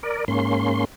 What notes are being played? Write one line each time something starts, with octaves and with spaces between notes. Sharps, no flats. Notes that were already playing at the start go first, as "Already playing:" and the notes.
A#4 D5
G#2 A#3 C#4 C6